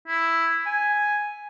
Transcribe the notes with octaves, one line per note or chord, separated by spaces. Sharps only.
E4
G#5